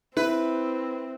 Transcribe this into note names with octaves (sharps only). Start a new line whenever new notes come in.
C4 E4 B4